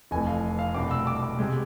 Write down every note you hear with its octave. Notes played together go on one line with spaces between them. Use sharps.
F1 F2 E3 A3 G#5
F5
F5
C2 B2 A3 D4 D6
E6
D6
D6
C3 G#3